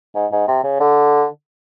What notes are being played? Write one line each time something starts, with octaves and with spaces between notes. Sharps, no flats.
G#2
G#2
C3
C#3
D3